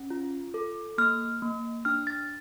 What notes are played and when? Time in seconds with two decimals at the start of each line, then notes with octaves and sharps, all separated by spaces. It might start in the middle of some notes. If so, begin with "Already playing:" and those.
Already playing: C#4
0.10 F4
0.54 A4
0.98 A#3 F6
1.42 A#3
1.85 D4 F6
2.07 A6